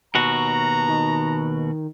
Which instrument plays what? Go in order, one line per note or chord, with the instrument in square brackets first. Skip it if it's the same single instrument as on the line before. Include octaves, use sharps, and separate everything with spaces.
[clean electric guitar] D#2 B2 F#4 [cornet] A#5
[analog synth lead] D#3